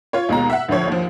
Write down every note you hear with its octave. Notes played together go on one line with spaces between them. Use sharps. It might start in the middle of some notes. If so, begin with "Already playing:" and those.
F4 C#5
D#2 B2 G#3 A#5
E5 F#5
D2 A2 F3 C#5
D#2 F3